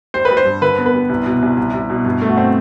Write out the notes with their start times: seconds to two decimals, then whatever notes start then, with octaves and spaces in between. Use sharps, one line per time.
0.14 G3 C5
0.25 B4
0.31 G3
0.37 C5
0.46 G2
0.61 D3 B4
0.78 B3
0.86 B4
0.94 G3
1.09 C2
1.26 B2
1.42 C2
1.57 C2
1.73 C2
1.90 B2
2.05 G2
2.22 A3
2.29 F#4
2.37 C4